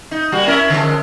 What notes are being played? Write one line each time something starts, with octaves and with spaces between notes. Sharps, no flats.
D#4
G3 A#3 F#4
C#4 E4 A#4
D3 F3 G#3